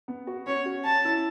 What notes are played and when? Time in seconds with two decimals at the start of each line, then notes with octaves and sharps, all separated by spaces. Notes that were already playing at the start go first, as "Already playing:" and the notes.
0.08 B3
0.27 F#4
0.46 C#4 C#5
0.66 F#4
0.85 C#4 A5
1.05 E4